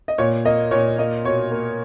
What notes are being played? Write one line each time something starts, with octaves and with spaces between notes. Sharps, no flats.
D#5
A#2 C#5
A#3 D#5
A#2 C#5
A#3 D#5
B2 C#5
A#3